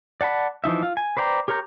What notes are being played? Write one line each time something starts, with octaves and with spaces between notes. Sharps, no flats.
D5 F#5 A5 B5
E3 F3 D#4 E5
F4
G#5
B4 C5 D5 G5 A#5
G4 A#4 C#5 A#5 G6